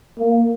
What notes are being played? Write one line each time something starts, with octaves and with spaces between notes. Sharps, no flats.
A#3